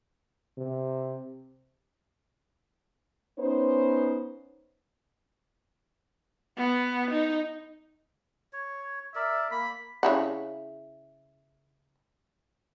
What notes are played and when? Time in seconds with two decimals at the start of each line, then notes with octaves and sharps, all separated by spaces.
0.58 C3
3.39 B3 C#4 D#4 C5
6.57 B3
7.11 D#4
8.53 C#5
9.15 A#4 D5 E5
9.51 A#3 B5
10.03 C#3 E4 F#5